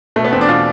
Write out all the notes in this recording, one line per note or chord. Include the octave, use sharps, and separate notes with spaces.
B2 A3
B3
E2 C4
D4
B2 F4